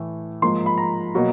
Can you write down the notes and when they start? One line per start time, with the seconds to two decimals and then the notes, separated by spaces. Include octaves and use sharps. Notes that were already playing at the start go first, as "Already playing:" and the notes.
Already playing: A2 E3 A3
0.42 G#2 F3 A#3 C6
0.66 B5
0.78 A#5
1.15 B2 F#3 A#3